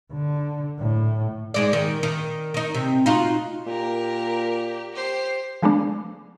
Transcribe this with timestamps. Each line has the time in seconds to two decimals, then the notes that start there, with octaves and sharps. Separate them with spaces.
0.12 D3
0.79 A2
1.54 G#2 G#3 D5
1.73 D#3
2.03 D#3
2.54 D#3 D#4
2.75 C3
3.06 D#4 F4 F#4
3.67 A#2 G4 A#4
4.93 G4 C5
5.62 F3 G#3 A3 B3 D4